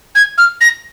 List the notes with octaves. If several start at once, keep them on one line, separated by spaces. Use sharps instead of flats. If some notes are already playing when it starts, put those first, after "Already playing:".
G#6
F6
A#6